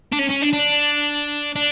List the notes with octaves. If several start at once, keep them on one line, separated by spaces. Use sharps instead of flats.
D4
C#4
C#4
D4
D4
D4